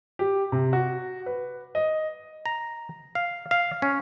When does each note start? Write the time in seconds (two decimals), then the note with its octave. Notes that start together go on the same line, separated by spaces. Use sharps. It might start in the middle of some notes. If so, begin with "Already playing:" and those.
0.19 G4
0.52 C3
0.73 F#4
1.26 B4
1.75 D#5
2.46 A#5
3.15 F5
3.51 F5
3.82 C#4